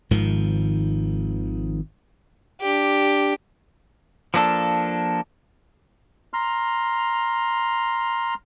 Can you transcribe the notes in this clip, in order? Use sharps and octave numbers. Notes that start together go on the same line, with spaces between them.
G#1 G#2 D#3 F3
D4 G4
F3 A#3 D4 A4
A#5 C6 F6